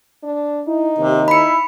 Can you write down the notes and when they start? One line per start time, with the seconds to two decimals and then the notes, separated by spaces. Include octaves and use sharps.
0.23 D4
0.68 D#4 E4
0.98 D#2 C3
1.28 E4 B5 C#7